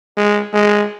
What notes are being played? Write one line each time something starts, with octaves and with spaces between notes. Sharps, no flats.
G#3
G#3